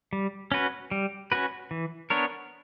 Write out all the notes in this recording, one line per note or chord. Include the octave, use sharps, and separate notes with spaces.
G3
C#4 F#4 B4
G3
C#4 F#4 B4
E3
B3 D4 A#4 C#5